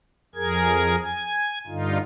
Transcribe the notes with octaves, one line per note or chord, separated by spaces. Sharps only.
F2 G#4 A#4 G#6
G#5 G#6
G2 D3 D#4 F4